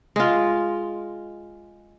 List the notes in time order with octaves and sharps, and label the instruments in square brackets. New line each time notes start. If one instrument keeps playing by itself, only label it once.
[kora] G#3 F4